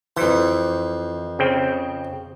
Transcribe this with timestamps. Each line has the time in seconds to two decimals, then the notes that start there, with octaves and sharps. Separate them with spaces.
0.17 F2 E3 C5
1.39 C#3 C4 G5